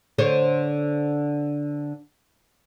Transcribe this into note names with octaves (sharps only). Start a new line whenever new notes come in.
D3 C5 C#5